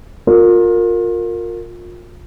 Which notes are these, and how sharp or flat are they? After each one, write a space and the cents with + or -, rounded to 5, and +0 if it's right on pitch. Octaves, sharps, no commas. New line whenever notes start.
F4 +30 A#4 -20